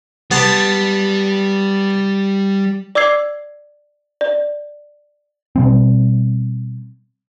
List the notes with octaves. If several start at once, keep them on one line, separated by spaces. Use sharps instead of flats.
G3 B3 A5 C6
D5 D6 E6 G#6 C7
D5
B2 G3 C4